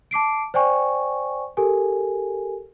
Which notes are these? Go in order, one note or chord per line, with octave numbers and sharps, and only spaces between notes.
A5 D6 C7 D7
C5 D5 G5 G#5 C#6
G4 A4 A#4 G#5